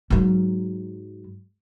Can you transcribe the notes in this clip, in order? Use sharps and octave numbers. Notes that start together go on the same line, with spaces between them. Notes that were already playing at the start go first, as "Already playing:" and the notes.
G#2 F#3